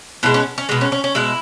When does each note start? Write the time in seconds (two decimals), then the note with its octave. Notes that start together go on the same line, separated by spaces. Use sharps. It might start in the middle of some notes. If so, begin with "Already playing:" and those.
0.23 B2 G#3 E4
0.34 C#4
0.58 C#4
0.69 B2 G#3 B3
0.81 C#4
0.92 C#4
1.04 C#4
1.15 B2 G#3 E4